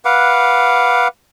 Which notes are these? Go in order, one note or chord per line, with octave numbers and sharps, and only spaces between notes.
B4 F5 F#5 D6